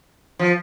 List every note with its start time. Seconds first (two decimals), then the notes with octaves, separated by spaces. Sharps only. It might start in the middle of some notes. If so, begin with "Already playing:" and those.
0.39 F3